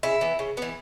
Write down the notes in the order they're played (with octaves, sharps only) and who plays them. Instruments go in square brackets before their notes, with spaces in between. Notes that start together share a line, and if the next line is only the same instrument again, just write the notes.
[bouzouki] C#3 E4
E3 B3
C#3
E3 B3